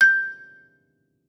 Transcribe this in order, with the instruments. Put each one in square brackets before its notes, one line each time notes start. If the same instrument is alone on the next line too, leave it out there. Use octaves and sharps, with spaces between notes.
[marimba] G6